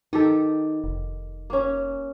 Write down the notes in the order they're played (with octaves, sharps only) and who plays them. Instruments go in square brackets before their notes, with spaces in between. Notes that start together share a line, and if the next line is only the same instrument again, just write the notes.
[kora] D#3 G4 A4 [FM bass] D#4
[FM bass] F1
[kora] A#3 C#4